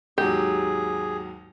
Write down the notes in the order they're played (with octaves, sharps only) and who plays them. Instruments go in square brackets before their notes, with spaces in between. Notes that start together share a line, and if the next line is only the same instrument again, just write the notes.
[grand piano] D#2 G#2 F#3 [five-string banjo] G4 [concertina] G#4